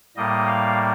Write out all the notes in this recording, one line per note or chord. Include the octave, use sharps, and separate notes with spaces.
A2 G3 A#3 D#5
F5